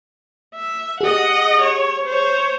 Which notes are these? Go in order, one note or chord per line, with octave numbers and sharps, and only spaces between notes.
E5
G4 G#4 D#5 F#5
C#5
C5 C#5